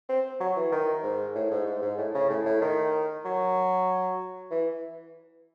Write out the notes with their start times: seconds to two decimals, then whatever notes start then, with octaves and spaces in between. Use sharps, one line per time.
0.09 C4
0.40 F#3
0.56 E3
0.72 D#3
1.03 G#2
1.36 A2
1.51 G#2
1.67 G#2
1.82 G#2
1.98 A2
2.15 C#3
2.30 A2
2.46 A2
2.61 D#3
3.25 F#3
4.51 E3